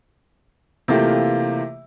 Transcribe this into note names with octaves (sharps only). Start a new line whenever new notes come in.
C3 E3 A3 A#3 F4 G4